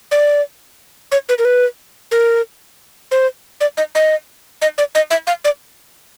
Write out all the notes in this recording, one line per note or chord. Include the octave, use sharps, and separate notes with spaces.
D5
C#5
B4
A#4
B4
A#4
C5
D5
D#5
D#5
D#5
D5
D#5
E5
F5
D5